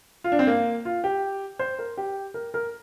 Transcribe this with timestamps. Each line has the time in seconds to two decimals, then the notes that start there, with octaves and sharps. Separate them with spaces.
0.24 F4
0.32 D4
0.39 C4
0.47 A#3
0.85 F4
1.04 G4
1.59 C5
1.79 A#4
1.97 G4
2.34 A#4
2.54 A#4